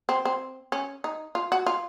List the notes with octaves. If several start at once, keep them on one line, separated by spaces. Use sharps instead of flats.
C4
C4
C#4
D#4
F4
F#4
F4